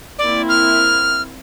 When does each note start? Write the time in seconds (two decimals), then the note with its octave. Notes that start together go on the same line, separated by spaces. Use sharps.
0.19 A#3 C4 E4 D5
0.49 F6